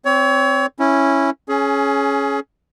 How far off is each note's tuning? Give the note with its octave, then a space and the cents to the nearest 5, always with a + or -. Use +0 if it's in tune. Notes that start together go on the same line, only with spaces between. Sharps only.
C4 +0 C#5 +30
C#4 -5 E4 +0
C#4 +0 G#4 +25